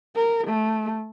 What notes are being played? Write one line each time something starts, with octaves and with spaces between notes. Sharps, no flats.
A#4
A3